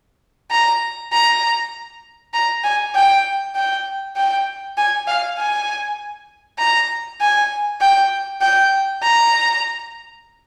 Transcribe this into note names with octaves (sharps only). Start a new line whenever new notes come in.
A#5
A#5
A#5
G#5
G5
G5
G5
G#5
F5
G#5
A#5
G#5
G5
G5
A#5